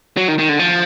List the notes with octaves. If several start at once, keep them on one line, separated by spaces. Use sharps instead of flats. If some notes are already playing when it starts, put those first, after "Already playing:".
F#3
D#3
D#3
D3
F3